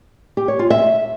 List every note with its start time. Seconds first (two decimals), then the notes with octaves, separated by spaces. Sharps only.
0.37 G4
0.48 C#5
0.59 F4
0.70 E5